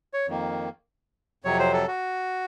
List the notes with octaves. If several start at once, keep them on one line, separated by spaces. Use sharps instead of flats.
C#5
F2 D#3 A#3
F2 C3 F#3 C#5
C5
A4
F#4